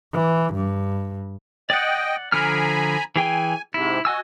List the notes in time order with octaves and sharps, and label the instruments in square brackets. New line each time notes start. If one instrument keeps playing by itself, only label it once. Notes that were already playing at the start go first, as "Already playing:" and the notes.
[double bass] E3
G2
[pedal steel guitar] D5 F#5 [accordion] D#5 G5
[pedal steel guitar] D3 F3 F6 [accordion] G#5 A#5 B5
[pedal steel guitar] E3 G#4 G5 [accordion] G#5
[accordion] G#2 C3 [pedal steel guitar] E4
[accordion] F#4 [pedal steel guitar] D#5 G#5 E6